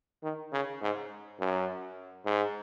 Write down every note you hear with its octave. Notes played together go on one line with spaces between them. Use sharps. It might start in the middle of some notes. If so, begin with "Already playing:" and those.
D#3
C#3
G#2
F#2
G#2